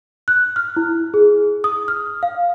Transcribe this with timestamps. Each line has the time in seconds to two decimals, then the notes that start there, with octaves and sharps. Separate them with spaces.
0.28 F#6
0.56 F6
0.76 E4
1.14 G#4
1.64 D#6
1.88 F6
2.23 F5